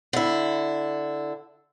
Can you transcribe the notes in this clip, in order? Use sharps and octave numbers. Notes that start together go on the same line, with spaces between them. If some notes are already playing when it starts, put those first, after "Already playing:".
D3 E4